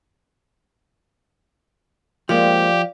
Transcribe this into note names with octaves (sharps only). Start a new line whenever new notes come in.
F3 G#3 A#3 C4 G4 D5 F5